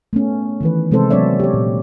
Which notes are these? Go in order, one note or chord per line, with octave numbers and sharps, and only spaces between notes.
A3 B3 C#4
D#3 E3 B4
C3 G#3 C4 D#4 A4 C5
F#3 B3 C#4 C#5 D5 E5
G4 C#5
A#2